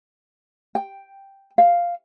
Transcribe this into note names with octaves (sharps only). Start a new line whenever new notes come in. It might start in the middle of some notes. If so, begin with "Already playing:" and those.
G5
F5